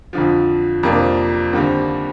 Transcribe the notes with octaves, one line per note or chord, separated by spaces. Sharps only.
F2 D3 F3
F2 C3 F3 A#3 D4
D#2 D3 G3 C4